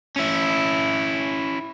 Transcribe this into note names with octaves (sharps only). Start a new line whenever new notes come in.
C#4 E4